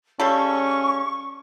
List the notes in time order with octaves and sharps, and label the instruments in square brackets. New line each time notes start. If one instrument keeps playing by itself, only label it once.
[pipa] C#3 G3 A4 [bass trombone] C#4 [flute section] C#6